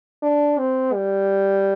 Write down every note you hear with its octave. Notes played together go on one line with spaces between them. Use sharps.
D4
C4
G3